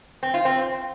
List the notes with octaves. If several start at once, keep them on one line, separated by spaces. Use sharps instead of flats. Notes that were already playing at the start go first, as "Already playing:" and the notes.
C4
F4
C4